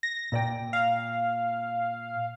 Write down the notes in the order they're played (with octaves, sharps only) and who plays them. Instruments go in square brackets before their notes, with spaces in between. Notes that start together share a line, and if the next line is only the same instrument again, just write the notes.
[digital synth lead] A#6
[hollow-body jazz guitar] A#2 D5 G5
[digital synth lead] F5